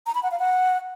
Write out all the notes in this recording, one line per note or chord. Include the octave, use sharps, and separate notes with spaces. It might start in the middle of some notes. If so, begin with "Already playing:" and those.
A#5
B5
F#5
F5
F#5